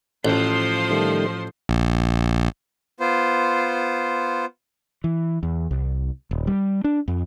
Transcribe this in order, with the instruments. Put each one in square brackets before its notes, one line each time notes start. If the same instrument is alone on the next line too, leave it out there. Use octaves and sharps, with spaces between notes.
[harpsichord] A1 [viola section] F3 C5 C6
[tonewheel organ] D#3 G3 A3
[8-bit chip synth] A#1
[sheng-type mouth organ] B3 F4 C5
[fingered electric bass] E3
E2
C2
D#1
G3
D4
F2